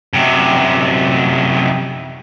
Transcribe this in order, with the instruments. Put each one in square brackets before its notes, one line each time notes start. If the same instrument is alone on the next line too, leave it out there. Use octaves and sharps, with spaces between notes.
[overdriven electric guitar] F#2 C3